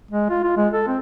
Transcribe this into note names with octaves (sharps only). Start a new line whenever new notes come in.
G#3
F4
F4
G#3
A4
C4